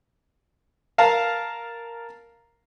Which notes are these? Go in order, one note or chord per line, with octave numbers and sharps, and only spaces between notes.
A#4 F5 A5 A#5